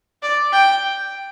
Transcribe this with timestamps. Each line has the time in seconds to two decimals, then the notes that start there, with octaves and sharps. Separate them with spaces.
0.22 D5
0.52 G5